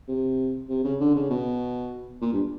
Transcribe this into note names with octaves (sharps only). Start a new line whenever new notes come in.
C3
C3
C#3
D3
C#3
B2
A#2
G2